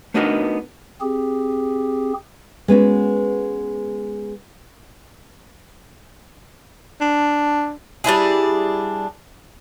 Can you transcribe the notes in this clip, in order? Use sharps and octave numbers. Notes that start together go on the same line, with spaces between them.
A3 B3 D4 D#4 F#4 A#4
C4 G4 G#4
G#3 B3 C#4 F#4
D4
G3 D4 E4 G#4